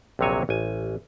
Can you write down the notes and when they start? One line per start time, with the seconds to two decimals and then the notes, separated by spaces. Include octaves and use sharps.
0.19 A#1 D#2 C3 F#3 C#5 G#5
0.49 A1 G#5